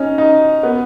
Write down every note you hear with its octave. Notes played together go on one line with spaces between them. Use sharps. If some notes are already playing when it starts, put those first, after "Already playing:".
Already playing: C#4 D#4
D#4
B3